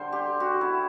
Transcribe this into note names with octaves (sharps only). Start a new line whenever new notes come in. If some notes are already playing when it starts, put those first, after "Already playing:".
Already playing: D3 G3 C5
G4
F#4
E4